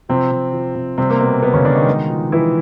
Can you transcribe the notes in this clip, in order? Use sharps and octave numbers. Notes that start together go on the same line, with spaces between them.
C3 F3 C4
C3
F3
C3
C3 G3 C4
A#3
B2 B3
B2 B3
C#3 C#4
B2 D3 D4
D#3 D#4
G#3
F3
E3 F3 E4